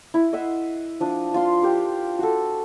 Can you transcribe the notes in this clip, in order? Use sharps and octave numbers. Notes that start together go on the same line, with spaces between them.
E4
D#5 E5 F#5 C6
F3 D4 D#6
F4 F5 C6
G4 A#4
F#4 A4